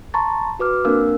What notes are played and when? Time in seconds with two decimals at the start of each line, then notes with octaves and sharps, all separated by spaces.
0.14 A5 A#5 C6 C#6 A6
0.59 F#4 B4 D6 F6
0.85 A#3 C4 D4 A#4 F5 E6